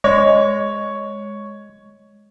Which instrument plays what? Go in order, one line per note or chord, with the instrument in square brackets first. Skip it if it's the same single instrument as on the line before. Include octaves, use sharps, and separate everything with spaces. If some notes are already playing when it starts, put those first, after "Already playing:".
[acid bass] G#3 [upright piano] C#5